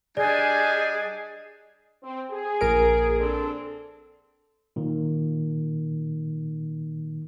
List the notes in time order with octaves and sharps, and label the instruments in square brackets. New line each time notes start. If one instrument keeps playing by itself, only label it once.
[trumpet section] G3 D4 G#5 [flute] G#4 [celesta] D5 [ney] D#5
[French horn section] C4
G#4
[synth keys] A#1 A#4 D7
[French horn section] C4 D4 A4
[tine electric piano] A#2 D#3